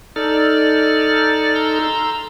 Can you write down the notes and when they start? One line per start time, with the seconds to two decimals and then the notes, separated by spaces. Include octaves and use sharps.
0.16 D#4 A4 D5 F6
1.55 A#5 C6 E6